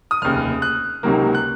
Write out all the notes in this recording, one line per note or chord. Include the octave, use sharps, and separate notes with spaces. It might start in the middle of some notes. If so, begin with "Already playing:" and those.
D#6
F1 D#2 C#3 F6
F#6
C#2 C3 D#3 F#3 A#3
F#6